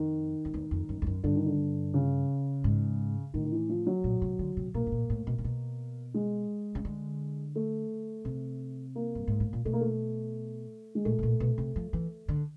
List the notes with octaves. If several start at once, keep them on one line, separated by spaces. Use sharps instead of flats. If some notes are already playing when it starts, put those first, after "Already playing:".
Already playing: F2 D#3
F2
E2
F2
F#2
F2
F#2
G2 D3
D#3
D3
C#3
G#2
A2 D#3
D#3
E3
F3
F#3
A#2
C3
D3
C3
B2 A#3
A2
A#2
A2
B2
C3
B2
G#3
C#3
D3
A3
C3
A#3
G2
G#2
A2
A#2
B2 A3
A#3
A3
G#3
A#2 A3
A2
A#2
B2
C3
F3
E3
D3